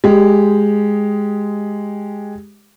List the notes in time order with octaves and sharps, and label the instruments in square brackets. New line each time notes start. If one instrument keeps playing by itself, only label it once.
[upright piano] G#3 G4